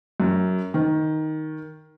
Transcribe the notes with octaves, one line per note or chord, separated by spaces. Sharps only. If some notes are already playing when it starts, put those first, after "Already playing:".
F#2
D#3